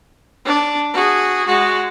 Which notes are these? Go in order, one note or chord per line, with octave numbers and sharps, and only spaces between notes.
D4
F#4 G#4
G#3 F#4